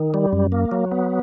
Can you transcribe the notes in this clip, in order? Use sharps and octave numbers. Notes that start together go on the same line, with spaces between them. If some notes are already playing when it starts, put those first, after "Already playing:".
Already playing: D#3
G3
F#2
A#3
F#3
B3